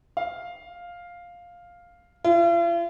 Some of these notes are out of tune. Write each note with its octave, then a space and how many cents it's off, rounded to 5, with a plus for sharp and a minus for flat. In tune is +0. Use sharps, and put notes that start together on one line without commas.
F5 +5
F4 -45